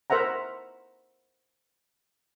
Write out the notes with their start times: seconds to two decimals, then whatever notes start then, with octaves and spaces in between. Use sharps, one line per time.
0.10 A#4 C5 E5 F#5 A#5